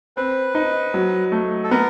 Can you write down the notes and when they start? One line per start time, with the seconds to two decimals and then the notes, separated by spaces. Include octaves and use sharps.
0.17 C4 B4
0.55 D#4
0.94 F#3
1.32 A3
1.64 A4
1.71 B3 A#4